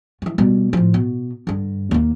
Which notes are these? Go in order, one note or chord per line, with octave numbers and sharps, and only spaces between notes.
E3 F3
B2 G3
A2 F3
B2
G2 D3
D#2 A#3